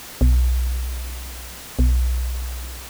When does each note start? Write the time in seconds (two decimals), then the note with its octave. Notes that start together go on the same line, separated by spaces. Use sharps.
0.21 B1
1.79 B1